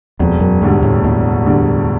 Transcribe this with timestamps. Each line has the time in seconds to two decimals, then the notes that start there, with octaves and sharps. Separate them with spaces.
0.19 E1 F2
0.40 F#2
0.62 D2 G#2 D3 G3
0.83 A2
1.04 E1 A2
1.46 D2 D3 G3